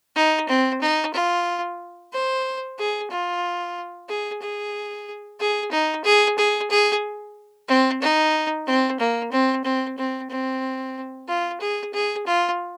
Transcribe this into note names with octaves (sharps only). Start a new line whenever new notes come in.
D#4
C4
D#4
F4
C5
G#4
F4
G#4
G#4
G#4
D#4
G#4
G#4
G#4
C4
D#4
C4
A#3
C4
C4
C4
C4
F4
G#4
G#4
F4